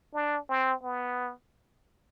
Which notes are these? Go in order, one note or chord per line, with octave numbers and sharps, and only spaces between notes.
D4
C4
B3